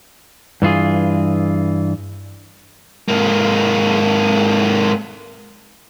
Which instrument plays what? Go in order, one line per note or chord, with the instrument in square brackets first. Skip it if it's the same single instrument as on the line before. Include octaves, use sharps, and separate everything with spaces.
[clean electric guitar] G2 E3 F4 G#4
[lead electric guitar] G#2 A#3